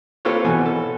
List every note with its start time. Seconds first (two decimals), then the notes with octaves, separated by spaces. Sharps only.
0.25 A#3 C4 F4 A4 B4 C#5
0.44 B2 E3 G#5
0.66 A4